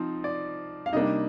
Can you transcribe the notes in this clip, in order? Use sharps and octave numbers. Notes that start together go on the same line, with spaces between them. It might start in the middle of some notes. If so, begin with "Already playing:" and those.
Already playing: F3 C4 D#4
D5
F5
C3 G3 A#3 D4 D#4 D#5